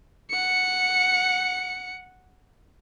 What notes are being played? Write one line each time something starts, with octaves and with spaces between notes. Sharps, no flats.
F#5 C#7